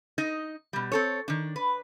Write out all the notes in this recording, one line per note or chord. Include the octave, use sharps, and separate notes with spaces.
D#4 D#5
B2 G3
C4 A4 C#5
D#3 D4
B4